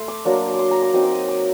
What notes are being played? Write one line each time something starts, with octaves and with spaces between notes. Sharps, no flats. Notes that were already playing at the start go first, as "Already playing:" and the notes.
Already playing: A3 C6
D6
F#3 A#3 D4
D6
C6
A#5
D6
F#3 C4 D#4 D#6
D6
D#6
D6